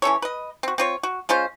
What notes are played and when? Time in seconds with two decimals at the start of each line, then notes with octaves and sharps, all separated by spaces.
0.02 E3 C#4 A4 C#5
0.22 B4 D#5
0.63 C4 F#4
0.78 C4 F4 C#5
1.03 F#4
1.29 G#3 C#4 F4 C5